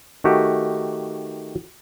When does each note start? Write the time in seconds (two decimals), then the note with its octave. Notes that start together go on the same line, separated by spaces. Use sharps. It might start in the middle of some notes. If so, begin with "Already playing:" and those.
0.24 D#3 A3 F#4 G4